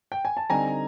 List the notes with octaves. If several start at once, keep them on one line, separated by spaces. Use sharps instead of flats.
G5
G#5
A5
D3 G3 C4 D#4 G#5 A#5